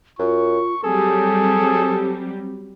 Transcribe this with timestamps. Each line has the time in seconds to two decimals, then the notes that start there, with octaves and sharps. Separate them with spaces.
0.19 F#2 F4 C#6
0.84 F#3 G3 C4 G#4 A4